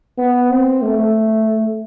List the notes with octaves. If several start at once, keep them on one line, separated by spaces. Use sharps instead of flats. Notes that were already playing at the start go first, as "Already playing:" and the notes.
B3
C4
A3